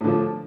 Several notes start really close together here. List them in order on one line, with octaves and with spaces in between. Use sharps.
A2 D3 F3